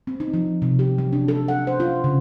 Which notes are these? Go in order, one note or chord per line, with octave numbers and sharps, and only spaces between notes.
C4
D#4
F3
C3
G4
F#3
D4
A4
F#5
C5
F4
C#3